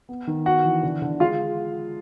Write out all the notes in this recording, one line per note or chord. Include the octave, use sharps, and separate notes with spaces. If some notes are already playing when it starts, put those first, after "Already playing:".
B3
D#3
B3 F#4 F#5
E3
D3
D3
G#3 F4 F5